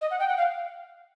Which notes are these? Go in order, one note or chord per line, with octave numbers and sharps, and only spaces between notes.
D#5
F#5
G5
F#5
F5